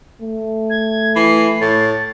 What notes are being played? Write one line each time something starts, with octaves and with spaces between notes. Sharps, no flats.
A3
G#6
E3 C7
A2 A6